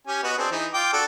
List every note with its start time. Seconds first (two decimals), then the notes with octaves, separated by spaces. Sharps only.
0.07 C#4 G4 G#5
0.24 B3 F#4 D#5
0.38 C4 D4 G#4
0.51 E3 D#4
0.74 F4 G5 D6
0.93 D4 F#4 A4